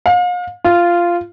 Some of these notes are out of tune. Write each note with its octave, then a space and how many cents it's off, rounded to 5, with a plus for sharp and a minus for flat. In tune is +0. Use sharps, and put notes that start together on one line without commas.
F5 +40
F4 -10